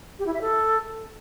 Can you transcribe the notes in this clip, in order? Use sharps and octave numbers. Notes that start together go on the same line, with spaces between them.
G4
E4
E5
A4